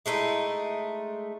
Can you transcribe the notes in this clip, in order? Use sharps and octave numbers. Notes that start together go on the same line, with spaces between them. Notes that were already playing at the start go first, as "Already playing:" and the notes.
G#3 A3 D#4 E4